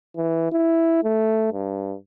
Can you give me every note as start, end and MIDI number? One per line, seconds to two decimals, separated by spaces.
0.17 0.50 52
0.52 1.02 64
1.04 1.50 57
1.53 1.95 43